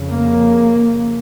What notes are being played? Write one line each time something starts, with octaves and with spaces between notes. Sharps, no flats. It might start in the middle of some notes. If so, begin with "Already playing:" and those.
Already playing: F2 C#3
A#3